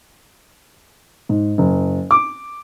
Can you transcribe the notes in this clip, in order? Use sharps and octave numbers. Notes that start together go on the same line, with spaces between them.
G#2
F#1
D6